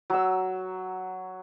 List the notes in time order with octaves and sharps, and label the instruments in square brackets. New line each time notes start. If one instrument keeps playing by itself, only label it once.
[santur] F#3 E6